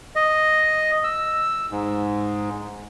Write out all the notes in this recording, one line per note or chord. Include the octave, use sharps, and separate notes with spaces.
D#5
E6
G#2